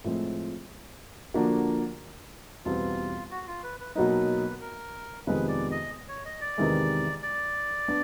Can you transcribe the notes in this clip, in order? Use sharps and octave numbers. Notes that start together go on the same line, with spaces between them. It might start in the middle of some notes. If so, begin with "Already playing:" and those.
A2 F3 G#3 C4
D3 F3 A#3 D4 F#4
E2 B2 G3 C4 F4
F#4
F4
B4
B4
B2 F#3 A#3 D#4 B4
A#4
F2 C3 D#3 G#3 B3 B4
D5
D#5
C#5
D#5
D5
E2 C3 D#3 G#3
D5
B3 D4